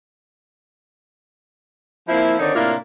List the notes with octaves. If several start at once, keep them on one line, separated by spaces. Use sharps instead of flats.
F3 A#3 C4 E4
D3 D#3 C4 D#4 C#5 D5
A2 C3 A#3 D4 E4 F4